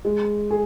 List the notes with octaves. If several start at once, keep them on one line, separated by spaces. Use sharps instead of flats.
G#3
G#4